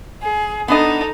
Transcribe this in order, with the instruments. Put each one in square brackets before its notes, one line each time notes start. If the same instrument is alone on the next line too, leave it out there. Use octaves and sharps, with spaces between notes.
[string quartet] G#4
[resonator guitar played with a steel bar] B3 D4 D#5 [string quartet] D#4 A4